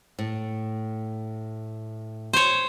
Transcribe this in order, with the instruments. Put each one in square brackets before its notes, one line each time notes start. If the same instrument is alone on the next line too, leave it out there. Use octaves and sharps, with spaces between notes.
[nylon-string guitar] A2
[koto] C5 C#5